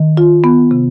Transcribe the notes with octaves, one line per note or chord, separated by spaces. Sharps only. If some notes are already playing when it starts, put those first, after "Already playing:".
Already playing: D#3
F4
B3
C3